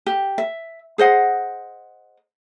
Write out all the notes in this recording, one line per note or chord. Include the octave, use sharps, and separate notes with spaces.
G4
E5
G#4 C5 D#5 F#5